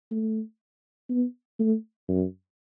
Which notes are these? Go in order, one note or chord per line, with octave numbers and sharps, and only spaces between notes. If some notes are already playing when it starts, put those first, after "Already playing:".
A3
B3
A3
F#2